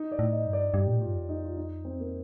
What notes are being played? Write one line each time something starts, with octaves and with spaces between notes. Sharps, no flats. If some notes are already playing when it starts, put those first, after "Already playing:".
Already playing: D#4
D5
A2
D#5
G2
D5
G2 G4
A#2
A2
G2 F4
F2
D#4
F4
D#4
C4
A#3